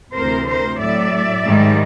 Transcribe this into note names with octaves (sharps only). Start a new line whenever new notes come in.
D2 C3 E3 A#4 C5
A#4 C5
A2 F#3 D5 E5
G#2 D#3 G3